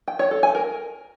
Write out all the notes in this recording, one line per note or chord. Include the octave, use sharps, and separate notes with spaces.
G5
C#5
A4
G#5
A#4